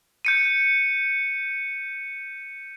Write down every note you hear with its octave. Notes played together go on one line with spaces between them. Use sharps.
G6 C#7 D#7